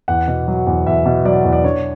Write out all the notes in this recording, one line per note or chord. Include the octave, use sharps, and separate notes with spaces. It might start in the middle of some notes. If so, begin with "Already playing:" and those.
E2 F#5
B2
F#3
E2
E2 E5
B2
F#3 D5
E2
D5
D4 C#5